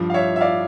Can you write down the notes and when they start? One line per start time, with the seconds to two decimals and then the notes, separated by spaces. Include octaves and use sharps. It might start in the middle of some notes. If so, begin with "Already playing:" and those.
Already playing: G2 F3
0.10 F5
0.14 C#5 E5
0.36 E5
0.41 D5 F5